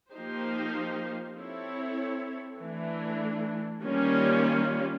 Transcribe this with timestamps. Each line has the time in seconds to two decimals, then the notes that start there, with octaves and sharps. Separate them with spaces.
0.13 F3 A#3 D#4 G4 C5
1.36 C4 E4 A4 C#5
2.60 E3 A3 D4
3.84 D#3 G3 A#3 C#4 F4